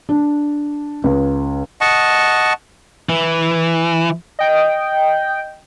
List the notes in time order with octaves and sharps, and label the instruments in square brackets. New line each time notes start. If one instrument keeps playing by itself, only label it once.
[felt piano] D4
C#2
[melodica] D#5 F#5 A5 C#6
[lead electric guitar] E3
[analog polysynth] D#5 G5